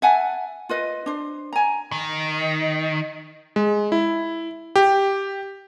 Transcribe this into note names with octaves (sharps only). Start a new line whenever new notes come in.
E5 F#5 G#5 A5
F4 B4 D#5
D4 C5
G#5 A#5
D#3
G#3
E4
G4